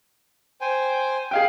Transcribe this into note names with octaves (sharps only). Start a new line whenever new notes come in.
C5 G5 G#5
G#4 F5 G5